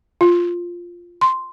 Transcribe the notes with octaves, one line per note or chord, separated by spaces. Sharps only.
F4
C6